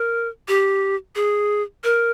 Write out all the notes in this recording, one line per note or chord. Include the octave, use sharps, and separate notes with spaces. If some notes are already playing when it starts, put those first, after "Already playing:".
Already playing: A#4
G4
G#4
A#4